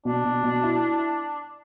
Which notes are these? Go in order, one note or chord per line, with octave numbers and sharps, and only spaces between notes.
B2 D4
B2
B2
E4